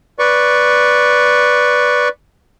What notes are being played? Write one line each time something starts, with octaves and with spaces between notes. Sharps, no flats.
B4 D5 C#6